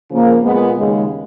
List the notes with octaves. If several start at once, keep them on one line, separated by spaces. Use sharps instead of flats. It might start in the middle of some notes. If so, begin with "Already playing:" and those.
C#3 F3 A#3
A#2 G#3 B3
D#2 C#3 G#3